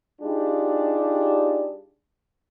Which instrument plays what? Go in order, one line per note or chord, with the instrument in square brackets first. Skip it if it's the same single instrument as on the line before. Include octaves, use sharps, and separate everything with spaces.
[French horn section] G3 D4 D#4 F4 G4 G#4